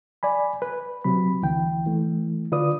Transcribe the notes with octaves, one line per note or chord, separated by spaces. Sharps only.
D5 G#5 B5
B4
C3 F#3 B5
D2 E3 G5
E3 A3
D3 F4 B4 D5 D#6